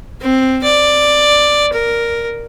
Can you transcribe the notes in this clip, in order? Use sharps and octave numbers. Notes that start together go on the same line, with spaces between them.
C4
D5
A#4